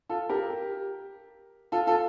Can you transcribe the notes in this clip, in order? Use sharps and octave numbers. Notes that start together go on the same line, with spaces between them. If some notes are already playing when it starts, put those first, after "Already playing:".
F4 A4
G4 A#4
F4 A4
F4 A4